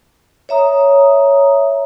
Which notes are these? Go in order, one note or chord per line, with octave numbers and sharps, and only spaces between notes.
C#5 E5 A#5 D#6